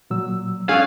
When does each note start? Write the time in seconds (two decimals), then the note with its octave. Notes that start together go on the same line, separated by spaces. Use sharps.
0.10 A#2 F#3 E6
0.69 C#4 D4 G#4 A4 D5 F5 F#6